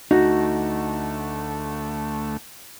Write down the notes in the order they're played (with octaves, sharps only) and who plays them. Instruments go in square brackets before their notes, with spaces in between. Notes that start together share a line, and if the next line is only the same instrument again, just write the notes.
[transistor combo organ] D2 A3 [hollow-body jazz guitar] D#4 [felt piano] F#4